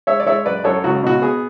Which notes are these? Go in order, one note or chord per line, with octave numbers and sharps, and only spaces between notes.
G#3 C#5 E5
D5
G#3 C#5 E5
F#2 B4 D5
F#2 A4 C#5
C#2 F#4
B2 F#4
B3 G#4